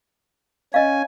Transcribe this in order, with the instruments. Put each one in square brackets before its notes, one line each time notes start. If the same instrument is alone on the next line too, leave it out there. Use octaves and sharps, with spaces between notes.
[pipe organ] C#4 G#5 [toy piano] D#5 F5